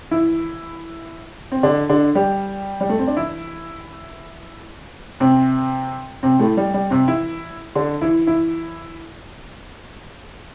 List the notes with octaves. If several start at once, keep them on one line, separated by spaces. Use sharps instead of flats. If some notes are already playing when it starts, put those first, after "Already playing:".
E3 E4
C4
D3 D4
D3 D4
G3 G4
G3
A3
C4
D4
E3 E4
C3 C4
C3 C4
A2 A3
G3
G3
C3 C4
E3 E4
D3 D4
E3 E4
E3 E4